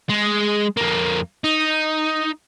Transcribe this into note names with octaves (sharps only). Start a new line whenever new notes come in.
G#3
F2 A#3
D#4